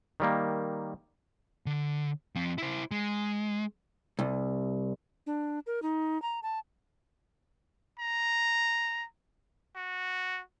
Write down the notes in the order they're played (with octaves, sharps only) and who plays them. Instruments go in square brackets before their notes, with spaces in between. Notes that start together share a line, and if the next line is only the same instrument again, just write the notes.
[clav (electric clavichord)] D#3 G3 A#3
[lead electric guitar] D3
F3 C4
E4 C5
G#3
[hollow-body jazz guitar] C2
[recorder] D4
A#4
D#4
A#5
A5
[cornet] A#5
F#4